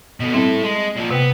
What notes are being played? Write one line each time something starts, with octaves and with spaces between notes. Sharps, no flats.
B2 D3
G3 C4 E4 A4
G#3
A#2 F3
C3 B3 G5